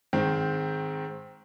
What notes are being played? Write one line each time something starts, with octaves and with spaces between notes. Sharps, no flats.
G#2 D#3 C4